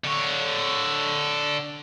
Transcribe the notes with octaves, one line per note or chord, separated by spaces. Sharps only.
D3 C#5